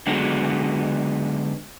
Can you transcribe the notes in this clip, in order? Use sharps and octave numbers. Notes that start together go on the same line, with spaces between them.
D3 F#3 G#3 B3